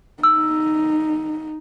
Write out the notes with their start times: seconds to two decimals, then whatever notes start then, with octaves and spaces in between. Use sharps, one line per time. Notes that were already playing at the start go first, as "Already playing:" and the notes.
0.23 D#4 E6